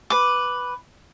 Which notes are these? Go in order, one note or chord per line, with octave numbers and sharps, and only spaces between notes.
B4 D6